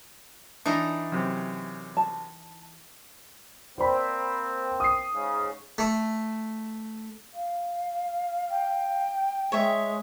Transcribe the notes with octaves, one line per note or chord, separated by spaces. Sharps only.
E3 D4 D#4 A#5
F#2 C3
A5
A#3 C4 C5 D5 B5
D#6 C7
G#2 C#3
A3
F5
G5
G#3 C#5 E5